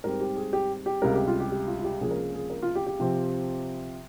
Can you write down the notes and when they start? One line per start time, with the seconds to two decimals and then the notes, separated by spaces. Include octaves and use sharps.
0.04 G#2 G3 C4 A#4
0.21 G4
0.36 G#4
0.53 G4
0.86 G4
1.02 C#2 C3 G3 A#4
1.15 G4
1.27 F4
1.40 G4
1.52 G4
1.67 F4
1.79 F4
1.84 G4
2.01 C#2 C3 F3 A#3 C#4 G#4
2.11 A#4
2.17 G#4
2.34 G#4
2.50 A#4
2.62 F4
2.75 G4
2.86 G4
3.00 C3 F3 C4